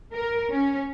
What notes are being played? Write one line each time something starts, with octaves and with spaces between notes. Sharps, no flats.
A#4
C#4